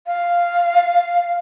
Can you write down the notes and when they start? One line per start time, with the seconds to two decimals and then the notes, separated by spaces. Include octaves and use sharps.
0.07 F5